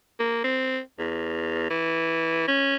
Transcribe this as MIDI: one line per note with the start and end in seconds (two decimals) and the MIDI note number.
0.19 0.41 58
0.44 0.80 60
0.99 1.67 40
1.70 2.46 52
2.48 2.76 61